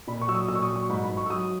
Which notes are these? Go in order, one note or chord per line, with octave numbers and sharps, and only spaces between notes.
A#2 B5
C#6
F#3 E6
D#6
A#2 E6
C#6
D#6
F#3
C#6
G#2 B5
B5
G#2
C#6
E6
F#3 D#6